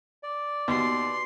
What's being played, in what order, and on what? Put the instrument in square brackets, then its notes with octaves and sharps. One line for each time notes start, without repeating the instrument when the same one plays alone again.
[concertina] D5
[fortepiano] D#2 [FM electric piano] B3 F#4 [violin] C6